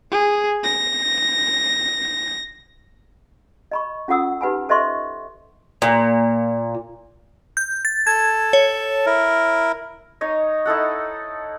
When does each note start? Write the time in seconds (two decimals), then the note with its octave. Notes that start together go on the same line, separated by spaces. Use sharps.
0.11 G#4
0.63 A#6
3.71 D#5 B5 C#6
4.08 C#4 F4 A4 F#5 D#6 E6
4.41 D#4 G4 B4 F#5 G#5 B5
4.69 A4 C5 D#5 E5 C6 C#6
5.82 A#2
7.57 G6
7.85 A6
8.07 A4 A5 G#6
8.53 C#5
9.06 E4 A#4
10.21 D#4 C#5 D#5
10.66 D#4 E4 A4 F#5